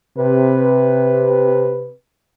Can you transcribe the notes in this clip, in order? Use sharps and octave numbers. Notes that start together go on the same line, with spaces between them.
C3 B4